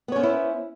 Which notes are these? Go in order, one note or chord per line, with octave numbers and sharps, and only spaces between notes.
B3 C#4 E4 C5 C#5